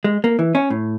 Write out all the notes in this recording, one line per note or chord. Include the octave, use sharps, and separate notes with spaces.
G#3
A#3
E3
C#4
A2